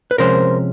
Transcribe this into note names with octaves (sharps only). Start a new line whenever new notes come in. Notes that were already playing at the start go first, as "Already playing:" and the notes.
B4
C3 F3 G#3 C#4 A#4 C5